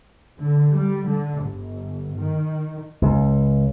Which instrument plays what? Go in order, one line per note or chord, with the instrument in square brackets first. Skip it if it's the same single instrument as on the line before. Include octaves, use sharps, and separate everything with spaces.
[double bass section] D3
G3
D3
G1
D#3
[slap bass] C#2